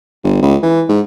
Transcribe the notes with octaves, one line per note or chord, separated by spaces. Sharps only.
G1
C#2
E3
G#2